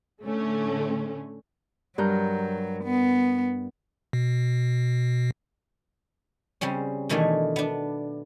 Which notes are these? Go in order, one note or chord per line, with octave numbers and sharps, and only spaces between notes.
A2 D3 A3 C#4
G2 F#3 A#4 G6
B3
B2
C#3 G3 C4 C#4
B2 D#3 E3 A3 D4 G#5
B3 D4